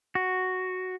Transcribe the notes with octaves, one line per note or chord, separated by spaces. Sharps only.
F#4